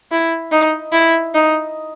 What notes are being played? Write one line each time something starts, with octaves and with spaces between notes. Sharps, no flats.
E4
D#4
E4
D#4